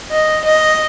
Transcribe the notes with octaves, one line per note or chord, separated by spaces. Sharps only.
D#5
D#5